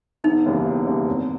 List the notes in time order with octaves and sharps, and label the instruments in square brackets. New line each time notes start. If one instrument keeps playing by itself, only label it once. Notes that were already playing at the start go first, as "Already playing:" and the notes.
[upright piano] E1 [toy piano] D#4
[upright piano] D#2 C#3 E3 G3
E1
D#2 C#3 E3 G3
G#1